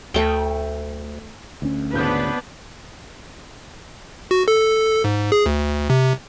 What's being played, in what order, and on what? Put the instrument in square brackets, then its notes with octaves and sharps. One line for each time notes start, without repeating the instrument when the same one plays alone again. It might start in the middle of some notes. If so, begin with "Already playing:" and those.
[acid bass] D2 [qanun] A3 G5
[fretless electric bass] D2 C#4
[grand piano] G#1 C#3 G6 [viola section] B3 D4 B4
[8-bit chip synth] F#4
A4
G#2
G#4
D2
C3